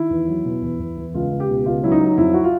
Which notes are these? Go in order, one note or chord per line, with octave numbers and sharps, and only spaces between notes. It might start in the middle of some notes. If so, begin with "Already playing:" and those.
Already playing: D#3 E4
E2
F#3
B2
E2
E2
E2
C#2 F4
C#2
G4
B2
C#2 F4
F#3 E4
D#4
F#3
F2 E4
F#4
F4